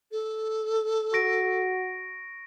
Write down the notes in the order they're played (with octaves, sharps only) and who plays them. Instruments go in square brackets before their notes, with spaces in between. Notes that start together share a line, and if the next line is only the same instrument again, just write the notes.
[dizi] A4
[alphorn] F#4 [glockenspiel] C#6 A#6 D7